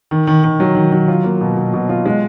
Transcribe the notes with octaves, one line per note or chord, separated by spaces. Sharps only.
D#3
D#3
D#3
F#3
D#3
F#3
F4
A#3
B2
B2
B2
F4
G#3